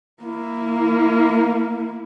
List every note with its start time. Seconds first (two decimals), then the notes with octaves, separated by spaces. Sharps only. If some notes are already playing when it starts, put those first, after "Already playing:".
0.23 A#3 E4